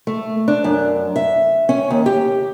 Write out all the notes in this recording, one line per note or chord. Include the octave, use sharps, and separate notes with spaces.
A3
D4
F#2
E5
C#4
D#2
G4